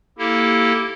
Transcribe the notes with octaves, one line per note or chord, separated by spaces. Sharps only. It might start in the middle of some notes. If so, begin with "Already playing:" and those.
A#3 E4 G4 A4